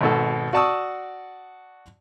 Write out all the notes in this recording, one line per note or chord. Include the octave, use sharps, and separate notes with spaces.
G#1 B2 A4
F#4 D5 A5 C#6 D#6 E6